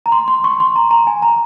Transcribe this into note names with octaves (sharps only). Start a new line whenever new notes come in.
A#5
C6
C6
C#6
C6
A#5
A#5
G#5
A#5